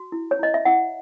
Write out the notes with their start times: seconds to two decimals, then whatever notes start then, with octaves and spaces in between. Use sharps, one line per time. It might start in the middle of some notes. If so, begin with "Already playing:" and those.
Already playing: F#4
0.12 E4
0.31 C#5
0.39 E4 D#5
0.54 E5
0.65 E4 F#5